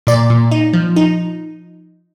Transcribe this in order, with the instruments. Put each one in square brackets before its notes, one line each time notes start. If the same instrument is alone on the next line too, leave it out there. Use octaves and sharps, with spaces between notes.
[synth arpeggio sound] A#2 D5
A#2
D#4
F3
D#4